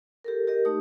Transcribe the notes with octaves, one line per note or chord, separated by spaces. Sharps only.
G4 A4 A#4
G4 A#4 D#5
A3 D#4 G4 D#6